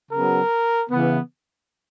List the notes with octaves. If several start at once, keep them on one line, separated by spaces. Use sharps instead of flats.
C#3 F#3 B3 A#4
C#3 E3 B3